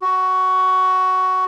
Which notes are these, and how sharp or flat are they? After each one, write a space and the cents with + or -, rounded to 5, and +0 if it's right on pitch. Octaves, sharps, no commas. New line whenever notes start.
F#4 +10